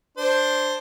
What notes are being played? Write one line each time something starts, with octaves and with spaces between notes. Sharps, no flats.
D4 C5